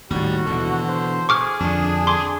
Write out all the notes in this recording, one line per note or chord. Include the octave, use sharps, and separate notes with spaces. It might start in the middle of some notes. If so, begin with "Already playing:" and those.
D#2 A2 G3 F#4
B2 D3 E3
C5
G#4 C#6 D6 F6
F2 D3 D4
G#4 C6 D6